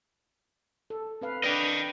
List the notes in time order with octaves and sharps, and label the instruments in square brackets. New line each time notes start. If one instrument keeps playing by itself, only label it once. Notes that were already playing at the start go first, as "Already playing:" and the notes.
[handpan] A4
C4 B4 F5
[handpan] D4 B4 D5 [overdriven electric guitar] D#5 G5